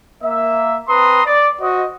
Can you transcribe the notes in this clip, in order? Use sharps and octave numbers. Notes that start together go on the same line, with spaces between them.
A#3 E5
C4 B4 A#5 C6 D#6
D5
F#4 C5 D#5